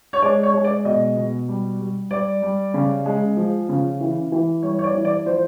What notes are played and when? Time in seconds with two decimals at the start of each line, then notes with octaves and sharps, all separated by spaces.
0.13 C#5
0.22 G#3 D5
0.43 C#5
0.54 G#3
0.64 D5
0.85 B2 D#5
1.17 B2
1.48 G3
1.80 G3
2.10 G3 D5
2.42 G3
2.74 C#3
3.06 G#3
3.37 F3
3.69 C#3
4.00 E3
4.32 E3
4.62 G3 C#5
4.79 C#5
4.84 D5
4.94 E3
5.05 D5
5.26 F3 C5